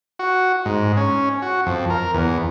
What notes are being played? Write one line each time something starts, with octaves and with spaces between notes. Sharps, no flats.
F#4
G#2
C#4
F#4
F2
A#4
E2